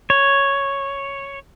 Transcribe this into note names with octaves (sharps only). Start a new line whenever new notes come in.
C#5